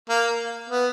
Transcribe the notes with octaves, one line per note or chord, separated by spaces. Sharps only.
A#3
B3